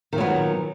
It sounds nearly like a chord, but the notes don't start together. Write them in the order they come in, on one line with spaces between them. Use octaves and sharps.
D#3 A#2 F#3 B3